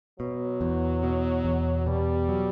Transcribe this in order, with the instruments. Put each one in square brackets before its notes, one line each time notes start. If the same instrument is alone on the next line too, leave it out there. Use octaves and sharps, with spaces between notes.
[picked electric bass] B2 [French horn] F#3
[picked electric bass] E2
B2
E2
[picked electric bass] B2 [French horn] G3
[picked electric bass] F#3